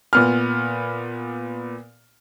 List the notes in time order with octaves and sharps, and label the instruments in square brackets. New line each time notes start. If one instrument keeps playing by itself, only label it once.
[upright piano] A#2 B3 F6